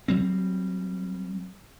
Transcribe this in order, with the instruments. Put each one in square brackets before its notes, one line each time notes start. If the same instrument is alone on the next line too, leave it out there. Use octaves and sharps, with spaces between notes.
[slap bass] F#3 G3 C4